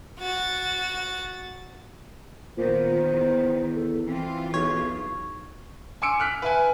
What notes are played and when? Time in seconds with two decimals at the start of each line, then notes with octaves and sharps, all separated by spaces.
0.19 F#4 A6
2.57 A#2 D#3 B3 C5
3.13 E2
3.75 A4
4.07 E3 C4 F4
4.54 B1 G#4 C#5
6.02 G#5 C6 D6 E6 C#7 D7
6.20 F6 F#6 B6
6.42 B4 E5 G#5